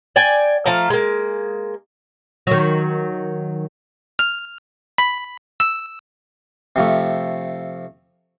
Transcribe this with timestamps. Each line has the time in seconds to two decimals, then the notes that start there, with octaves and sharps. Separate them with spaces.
0.16 D5 G5 G#5
0.66 F3 A3 F5 A#5
0.90 G#3 A#3
2.47 D#3 F#3
4.19 F6
4.98 B5
5.60 E6
6.76 C3 F3 A3